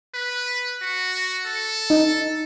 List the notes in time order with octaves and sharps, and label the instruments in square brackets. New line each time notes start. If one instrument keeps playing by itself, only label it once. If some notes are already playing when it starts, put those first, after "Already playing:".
[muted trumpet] B4
F#4
A4
[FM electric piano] D#4